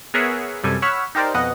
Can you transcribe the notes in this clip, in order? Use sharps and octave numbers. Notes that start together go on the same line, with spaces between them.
B3 G#4 A#4 C#5 E5 F#5
F#2 C3 G3 A4 G#5
C#5 F#5 B5 C#6 E6 F6
D#4 G4 A#4 C5 D5
F2 B2 B3 D#5 F#5